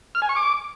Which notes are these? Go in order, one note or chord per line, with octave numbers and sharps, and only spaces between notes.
F6
G#5
C#6
D6